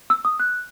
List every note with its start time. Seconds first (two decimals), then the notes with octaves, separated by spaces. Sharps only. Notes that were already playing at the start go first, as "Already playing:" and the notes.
0.10 E6
0.25 D#6
0.40 F#6